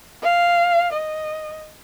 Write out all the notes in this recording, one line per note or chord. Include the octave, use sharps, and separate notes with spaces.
F5
D#5